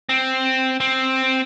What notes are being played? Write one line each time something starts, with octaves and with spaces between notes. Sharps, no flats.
C4
C4